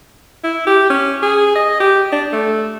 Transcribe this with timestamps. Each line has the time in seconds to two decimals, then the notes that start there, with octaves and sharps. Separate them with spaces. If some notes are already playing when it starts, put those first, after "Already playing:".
0.44 E4
0.67 G4
0.90 C#4
1.22 G#4
1.55 D#5
1.80 G4
2.12 D4
2.33 A3